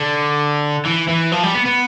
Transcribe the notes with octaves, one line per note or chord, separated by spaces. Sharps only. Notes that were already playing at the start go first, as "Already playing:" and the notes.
Already playing: D3
E3
E3
F3
G3
B3
B3